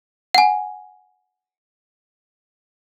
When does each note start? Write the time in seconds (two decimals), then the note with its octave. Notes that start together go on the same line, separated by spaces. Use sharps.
0.35 F#5 G#5